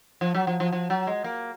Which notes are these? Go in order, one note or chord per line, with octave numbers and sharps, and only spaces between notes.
F3
F#3
F3
F3
F3
F#3
G#3
A#3